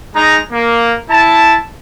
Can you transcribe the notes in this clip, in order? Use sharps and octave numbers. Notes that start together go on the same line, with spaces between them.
G#3 D#4 A#5
A#3
E4 A5